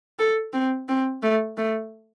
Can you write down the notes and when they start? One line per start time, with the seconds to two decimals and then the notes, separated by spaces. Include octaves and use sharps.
0.19 A4
0.53 C4
0.88 C4
1.23 A3
1.57 A3